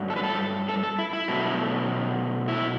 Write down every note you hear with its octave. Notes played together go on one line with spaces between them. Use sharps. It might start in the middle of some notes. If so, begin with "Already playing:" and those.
Already playing: G2 F#3 A3
A4
B4
A4
A4
A4
E4
E4
B2 F#3 A3
E4